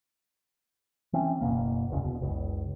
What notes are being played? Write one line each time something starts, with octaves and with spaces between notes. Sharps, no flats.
E3 C4 C#4
F#1 E2 B2 A#3
E1 C#2 C#3
E1 B2
F#1 C#2